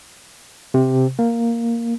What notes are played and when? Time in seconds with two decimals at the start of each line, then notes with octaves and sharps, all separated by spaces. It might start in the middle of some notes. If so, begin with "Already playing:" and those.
0.74 C3
1.19 A#3